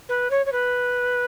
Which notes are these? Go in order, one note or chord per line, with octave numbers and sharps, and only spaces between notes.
B4
C#5
C#5
B4